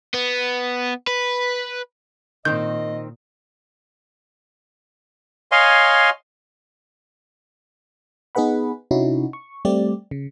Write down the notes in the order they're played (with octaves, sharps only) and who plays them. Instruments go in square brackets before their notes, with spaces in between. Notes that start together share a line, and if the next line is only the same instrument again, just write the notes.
[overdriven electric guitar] B3
B4
[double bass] A#2 [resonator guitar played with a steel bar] D#3 C4 [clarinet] D#5 [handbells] G6
[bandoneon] C#5 D#5 F5 G#5 C6
[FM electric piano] B3 D#4 G#4 B4 F#5 B5
C3 C#4 D#4 E4 F#4
C#6
G3 A3 C4 G4 D5
C#3